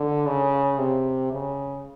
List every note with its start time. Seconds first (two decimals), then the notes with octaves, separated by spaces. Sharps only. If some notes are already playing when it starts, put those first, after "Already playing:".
Already playing: D3
0.26 C#3
0.78 C3
1.32 C#3